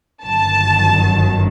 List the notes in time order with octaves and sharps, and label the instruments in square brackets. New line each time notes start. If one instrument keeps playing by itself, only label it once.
[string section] G1 F#2 D#3 F#3 A5